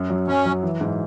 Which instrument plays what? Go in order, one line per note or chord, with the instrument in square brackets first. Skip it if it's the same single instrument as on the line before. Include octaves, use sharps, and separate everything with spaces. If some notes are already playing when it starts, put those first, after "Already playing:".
Already playing: [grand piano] F#2
F#3
[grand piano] F#2 [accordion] C#4
[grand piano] F#3
E3
G#2